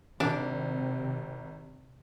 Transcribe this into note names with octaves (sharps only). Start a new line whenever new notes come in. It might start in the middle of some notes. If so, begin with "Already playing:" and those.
G#1 C3 D4